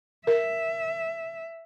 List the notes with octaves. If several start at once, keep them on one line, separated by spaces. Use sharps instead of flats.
A#4 E5